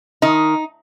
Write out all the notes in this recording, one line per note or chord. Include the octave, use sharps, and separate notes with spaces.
D#3 D#4